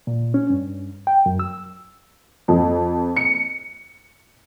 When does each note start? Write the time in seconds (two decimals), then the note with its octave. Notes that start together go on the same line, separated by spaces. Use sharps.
0.07 A#2
0.34 C#4
0.50 G2
1.07 G5
1.26 F#2
1.39 E6
2.48 F2
3.16 C#7